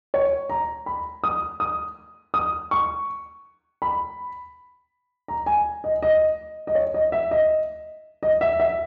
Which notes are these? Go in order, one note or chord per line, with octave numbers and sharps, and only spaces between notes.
C#5
A#5
B5
D#6
D#6
D#6
C#6
B5
A#5
G#5
D#5
D#5
D#5
C#5
D#5
E5
D#5
D#5
E5
E5